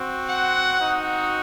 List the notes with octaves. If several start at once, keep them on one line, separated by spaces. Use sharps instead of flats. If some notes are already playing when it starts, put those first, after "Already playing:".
Already playing: C4 F#4
F#5
C4 D#4 F#4